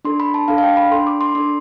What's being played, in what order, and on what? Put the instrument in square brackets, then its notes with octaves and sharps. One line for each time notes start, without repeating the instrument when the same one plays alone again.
[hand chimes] D4 A4 C6
B5
A5
D4 A4 F5
F5
G5
B5
D4 A4 C6
D6
C6
D4 A4 C6